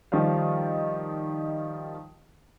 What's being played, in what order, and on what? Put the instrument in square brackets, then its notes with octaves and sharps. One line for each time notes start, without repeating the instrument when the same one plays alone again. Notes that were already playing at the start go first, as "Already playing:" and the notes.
[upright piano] D#3 F3 G3 F5